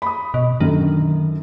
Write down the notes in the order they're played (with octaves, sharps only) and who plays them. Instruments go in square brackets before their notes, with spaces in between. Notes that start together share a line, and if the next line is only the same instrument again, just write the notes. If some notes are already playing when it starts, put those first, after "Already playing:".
[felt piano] B5 D#6
[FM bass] B2 [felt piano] D#5
[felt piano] F#2 D3 [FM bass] D#3